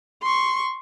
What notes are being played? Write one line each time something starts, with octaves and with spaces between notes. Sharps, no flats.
C6 C#6